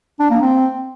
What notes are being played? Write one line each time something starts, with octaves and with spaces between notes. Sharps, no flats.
D4
A#3
C4